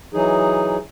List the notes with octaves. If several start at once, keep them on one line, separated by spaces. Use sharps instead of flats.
E3 F#3 D#4 G#4